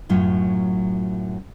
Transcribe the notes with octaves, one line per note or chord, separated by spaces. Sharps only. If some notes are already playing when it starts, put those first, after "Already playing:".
F#2 A2 F#3 F4